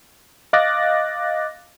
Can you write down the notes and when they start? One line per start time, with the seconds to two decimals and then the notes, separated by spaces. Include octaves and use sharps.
0.53 D#5 F5 D6 F#6 A6 A#6